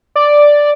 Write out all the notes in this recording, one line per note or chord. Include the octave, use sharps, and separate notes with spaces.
D5